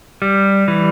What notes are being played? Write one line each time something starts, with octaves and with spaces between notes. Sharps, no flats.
G3
E3